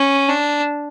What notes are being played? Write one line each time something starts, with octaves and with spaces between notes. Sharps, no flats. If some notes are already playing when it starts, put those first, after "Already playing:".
Already playing: C#4
D4